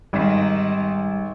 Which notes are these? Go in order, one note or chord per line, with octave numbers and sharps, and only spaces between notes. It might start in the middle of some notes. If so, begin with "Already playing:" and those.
G#1 D#3 G3